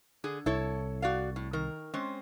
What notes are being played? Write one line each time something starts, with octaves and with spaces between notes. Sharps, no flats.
D3 G#4
C2 E4 A4 C#5
F#4 D5 F5
A2
D#3 A#4
G#3 C4 C#4